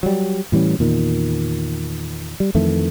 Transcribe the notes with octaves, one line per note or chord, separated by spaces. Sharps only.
F#3 G3
A2 E3 G3 C#4
E2 A#2 D#3
G3
F2 D#3 E3 A3